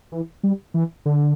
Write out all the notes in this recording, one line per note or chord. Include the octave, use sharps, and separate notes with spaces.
E3
G3
E3
D3